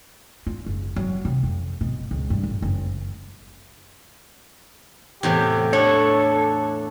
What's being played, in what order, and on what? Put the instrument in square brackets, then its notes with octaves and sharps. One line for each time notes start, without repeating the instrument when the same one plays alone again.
[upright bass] F4
F#1
F#3
C3
F2
B2
C#2
G2
A1
F#1
[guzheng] E2 A2 C3 [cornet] G4
[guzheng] D4 [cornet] A4 [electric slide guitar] C#5